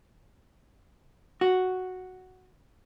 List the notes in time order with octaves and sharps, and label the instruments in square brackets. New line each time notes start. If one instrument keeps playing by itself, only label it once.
[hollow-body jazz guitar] F#4